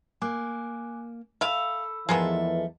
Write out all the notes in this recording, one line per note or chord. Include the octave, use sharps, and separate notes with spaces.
A#3 G#5 D6 F#6
A4 E5 F5 B5 E6
E2 E3 F3 G#3 A#3 B3 A4 E5